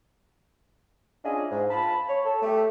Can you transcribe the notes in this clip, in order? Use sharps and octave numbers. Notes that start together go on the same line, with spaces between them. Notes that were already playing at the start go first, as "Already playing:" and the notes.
C#4 D4 E4 F4 G#4 D#5
G#2
F4 A5 B5
C#5
A4
A3 G4